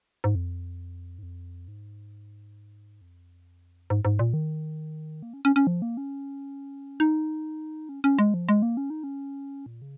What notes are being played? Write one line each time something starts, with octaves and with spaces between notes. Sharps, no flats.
G#2
F2
G#2
F2
G#2
F2
G#2
G#2
A#2
D#3
A#3
C#4
C#4
C#4
F3
A#3
C#4
D#4
C#4
C#4
G#3
F3
G#3
A#3
C#4
D#4
C#4
A#2
C#3